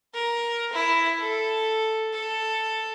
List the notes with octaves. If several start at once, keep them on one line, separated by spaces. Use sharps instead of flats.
A#4
E4
A4
A4